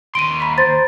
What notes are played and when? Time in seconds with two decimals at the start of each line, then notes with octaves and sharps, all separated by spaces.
0.15 D#2 C6 D7 D#7
0.40 A#5 B5 B6
0.58 C5 A6